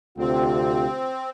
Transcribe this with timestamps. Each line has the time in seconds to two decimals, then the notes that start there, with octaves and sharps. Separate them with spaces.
0.18 D2 C3 C4 F4